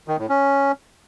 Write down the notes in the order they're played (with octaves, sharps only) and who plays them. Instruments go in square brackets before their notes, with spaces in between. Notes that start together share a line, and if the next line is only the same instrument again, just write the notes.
[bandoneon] D#3
A2
C#4